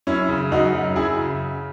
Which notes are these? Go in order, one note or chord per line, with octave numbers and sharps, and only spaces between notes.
F#2 C#4 E4
C#3
F#2 D#4 F#4
F#3
F#2 E4 G#4
C#3